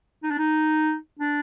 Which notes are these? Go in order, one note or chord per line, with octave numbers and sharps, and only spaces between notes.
D#4
D4
D#4
D4